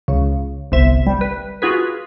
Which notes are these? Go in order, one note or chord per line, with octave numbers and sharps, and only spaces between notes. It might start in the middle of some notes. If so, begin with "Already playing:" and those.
C#2 C#3
G1 C2 C3 E5
G3
B4
F4 F#4 G#4 B4